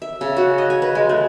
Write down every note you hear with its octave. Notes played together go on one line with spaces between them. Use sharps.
E5
C#3
F#4
D#5
G#5
B4
G#3
A3